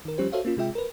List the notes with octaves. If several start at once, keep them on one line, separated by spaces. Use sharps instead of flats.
D#3 A#4
F3 G3 C#4 G4 C5
F#4 A4 C5 C#5 E5 F5
A#3 C#4 F4
C3 G#3 F4 E5 G5
A#4 B4